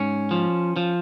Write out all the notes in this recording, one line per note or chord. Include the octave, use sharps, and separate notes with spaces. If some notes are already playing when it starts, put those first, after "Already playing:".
Already playing: G#2 C#4
F3
F3